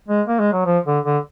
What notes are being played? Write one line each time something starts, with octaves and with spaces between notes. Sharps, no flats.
G#3
A#3
G#3
F#3
F3
D3
D3